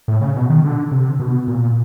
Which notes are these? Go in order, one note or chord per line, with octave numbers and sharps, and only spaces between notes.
A2
C#3
B2
D#3
D3
C3
B2
A#2